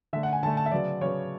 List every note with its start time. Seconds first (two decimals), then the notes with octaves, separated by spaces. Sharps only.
0.13 D3 A3 E5
0.23 F#5
0.33 G#5
0.43 D3 A3 A5
0.57 A5
0.66 E5
0.72 C#3 F#3 B3 D5
1.01 C#3 F#3 B3 C#5